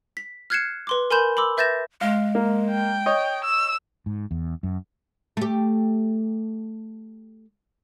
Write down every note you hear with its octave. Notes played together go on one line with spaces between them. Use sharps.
B6
F6 F#6 G#6 C7 C#7 E7
B4 C6 D6
A#4 G#5 B5 C6 G6 E7
B5 C6 D6 E6
B4 E5 G6 A6 A#6 E7
G#3 F5
A#3
G5
C#5 D#5
E6
G#2
E2
F#2
A3 G4